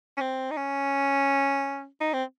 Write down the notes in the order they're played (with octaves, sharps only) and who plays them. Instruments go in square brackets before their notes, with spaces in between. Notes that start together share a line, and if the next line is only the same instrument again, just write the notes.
[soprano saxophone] C#4
C4
D#4
C#4
D#4
C4